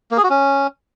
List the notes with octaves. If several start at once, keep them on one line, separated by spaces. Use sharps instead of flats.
A#3
G#4
F#4
C#4